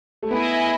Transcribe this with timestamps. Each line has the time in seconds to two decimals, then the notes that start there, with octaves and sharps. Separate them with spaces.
0.23 A3
0.31 B3 E4 G#4 D#5